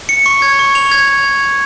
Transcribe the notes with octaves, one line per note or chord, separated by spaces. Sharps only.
C#7
C#6
G#6
C#6
F7
G#6